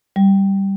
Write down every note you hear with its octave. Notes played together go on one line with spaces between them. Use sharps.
G3